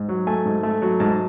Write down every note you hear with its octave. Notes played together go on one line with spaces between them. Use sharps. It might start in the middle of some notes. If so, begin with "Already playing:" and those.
Already playing: G#2
F#3
A3 G#5
G#2
A3
F#3
G#2 A5